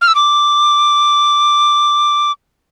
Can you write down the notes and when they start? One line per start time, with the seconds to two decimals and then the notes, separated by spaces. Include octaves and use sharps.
0.02 F6
0.08 E6
0.15 D6